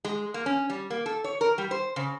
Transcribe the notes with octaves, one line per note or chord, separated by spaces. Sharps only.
G#3
A#3
C#4
G3
A#3
A4
C#5
A#4
G3
C5
C#3